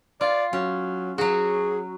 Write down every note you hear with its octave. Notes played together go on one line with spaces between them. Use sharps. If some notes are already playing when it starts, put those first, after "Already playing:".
F4 D5
F#3 C#4
F#3 F#4 G#4